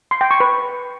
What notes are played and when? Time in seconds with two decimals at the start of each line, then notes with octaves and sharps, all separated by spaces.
0.11 C6
0.21 G5
0.31 C#6
0.40 B4